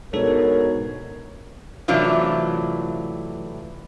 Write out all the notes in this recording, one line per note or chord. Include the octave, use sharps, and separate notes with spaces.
G#2 B2 D4 A4 A#4 C#5
A2 C3 E3 F#3 D4 F4